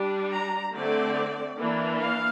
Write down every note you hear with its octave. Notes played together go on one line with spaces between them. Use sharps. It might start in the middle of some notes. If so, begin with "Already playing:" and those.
Already playing: G3 D4
A#5
D3 A3 C4 D5
E3 A#3 D4
F5